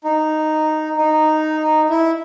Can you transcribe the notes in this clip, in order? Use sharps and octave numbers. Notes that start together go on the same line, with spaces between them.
D#4
D#4
E4